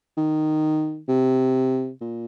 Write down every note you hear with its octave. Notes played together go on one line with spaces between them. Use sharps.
D#3
C3
A#2